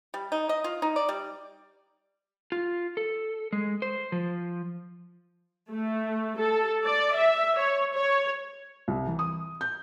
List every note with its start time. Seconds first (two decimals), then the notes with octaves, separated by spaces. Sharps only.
0.14 G3
0.32 D#4
0.49 D#5
0.64 F4
0.82 D#4
0.96 D5
1.09 G3
2.52 F4
2.97 A4
3.53 G#3
3.82 C5
4.12 F3
5.71 A3
6.39 A4
6.84 D5
7.17 E5
7.59 C#5
7.94 C#5
8.88 C2
9.07 E3
9.19 D#6
9.61 G6